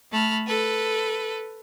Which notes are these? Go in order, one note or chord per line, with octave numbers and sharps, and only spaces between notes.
A3 A5 B5 F6
A4 B4